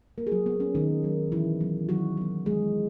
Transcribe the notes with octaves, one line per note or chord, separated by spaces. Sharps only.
A#2 A#3 A#4
G#4
F#3 F#4
A#3 B3
C#4
B2 D#3 D#4
F#3 B3
B2 E3 E4
F#3 B3
D#3 F#3 F#4
F#3 B3
D#3 G#3 G#4